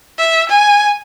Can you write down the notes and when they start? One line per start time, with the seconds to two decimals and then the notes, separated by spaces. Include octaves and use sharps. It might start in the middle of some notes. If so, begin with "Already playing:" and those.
0.18 E5
0.49 G#5